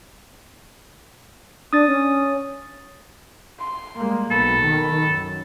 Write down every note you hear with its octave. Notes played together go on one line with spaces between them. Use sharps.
D4 D#6 A6
C#4
C6
G3 G#3 A#3
B1 B2 A4 B5
D#3
F#2